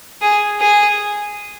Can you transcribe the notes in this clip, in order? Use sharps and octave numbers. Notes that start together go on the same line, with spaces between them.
G#4
G#4